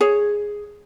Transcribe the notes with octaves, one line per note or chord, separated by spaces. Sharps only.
G#4 C#5